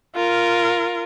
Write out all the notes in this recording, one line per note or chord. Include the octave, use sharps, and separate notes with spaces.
F4 A#4